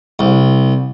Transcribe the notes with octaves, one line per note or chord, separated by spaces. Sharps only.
C2